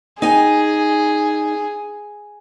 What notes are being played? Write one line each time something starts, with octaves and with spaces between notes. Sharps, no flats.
D#4 G#4 G#5